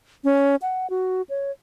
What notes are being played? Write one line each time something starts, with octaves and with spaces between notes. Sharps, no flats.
C#4
F#5
F#4
C#5